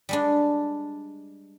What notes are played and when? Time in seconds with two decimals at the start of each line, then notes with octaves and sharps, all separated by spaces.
0.09 G3 G#3 D4